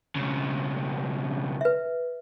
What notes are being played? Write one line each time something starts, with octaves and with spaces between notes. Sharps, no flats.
B1 C#3
B4 E5